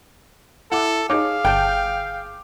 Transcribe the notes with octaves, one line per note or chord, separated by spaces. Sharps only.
E4 A4 F#5 D6
D#4 G#4 C#5 F5 D6
G1 G5 A5 G6